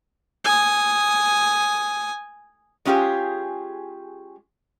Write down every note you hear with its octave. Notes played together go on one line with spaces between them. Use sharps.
G#5 D#6
G#3 C#4 F4 G4 G#4